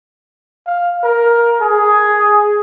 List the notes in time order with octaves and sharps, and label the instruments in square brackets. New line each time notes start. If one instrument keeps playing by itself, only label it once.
[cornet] F5
A#4
G#4